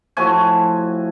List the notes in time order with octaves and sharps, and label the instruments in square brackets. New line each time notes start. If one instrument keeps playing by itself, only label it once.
[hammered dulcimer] A2 F3 F#4 G#5